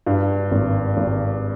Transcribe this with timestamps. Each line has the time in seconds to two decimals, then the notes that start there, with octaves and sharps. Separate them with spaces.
0.07 G2
0.51 G#1
0.97 G#1